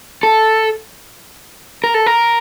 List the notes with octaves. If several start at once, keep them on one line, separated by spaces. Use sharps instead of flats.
A4
A#4
A4
A#4